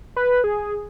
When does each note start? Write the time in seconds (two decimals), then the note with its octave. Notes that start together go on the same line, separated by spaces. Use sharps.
0.16 B4
0.44 G#4